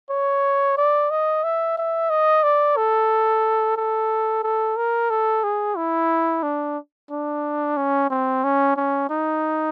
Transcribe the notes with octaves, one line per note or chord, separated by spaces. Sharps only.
C#5
D5
D#5
E5
E5
D#5
D5
A4
A4
A4
A#4
A4
G#4
E4
D4
D4
C#4
C4
C#4
C#4
D#4